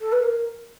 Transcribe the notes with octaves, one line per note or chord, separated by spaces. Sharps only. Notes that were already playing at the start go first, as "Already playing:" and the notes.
A4
B4
A#4